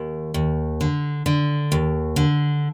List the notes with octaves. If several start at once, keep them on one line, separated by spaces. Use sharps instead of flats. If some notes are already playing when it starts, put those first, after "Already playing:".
Already playing: D#2
D#2
D3
D3
D#2
D3